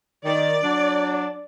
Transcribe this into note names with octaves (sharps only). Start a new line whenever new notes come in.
D#3 D5
F#3 D4